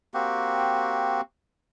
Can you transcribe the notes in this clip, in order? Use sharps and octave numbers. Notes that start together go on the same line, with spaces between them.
A#3 C4 F#4 G4